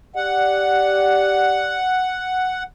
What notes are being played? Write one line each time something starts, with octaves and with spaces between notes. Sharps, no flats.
G4 D5 F#5